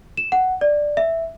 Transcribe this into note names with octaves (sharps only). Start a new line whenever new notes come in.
E7
F#5
D5
E5